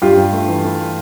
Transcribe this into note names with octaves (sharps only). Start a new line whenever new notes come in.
G2 F4 G4
G2
A3
E3
A3